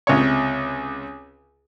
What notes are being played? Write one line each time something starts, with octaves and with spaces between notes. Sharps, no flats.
C#2 C3 C#5